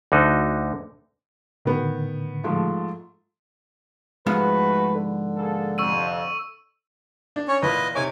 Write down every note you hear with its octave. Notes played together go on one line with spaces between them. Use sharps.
D2 D3 D#4 F#4 A4
A2 D3 D#3 B3
G#2 F3 A3
G#2 F3 A3 B3 F#4 B4
D3
A#3 G#4 A4
F2 C3 C#6 E6 D#7
D4
C#4 C#5
E2 A#2 B4 D#5
C3 D#4 C#5 G#5 D6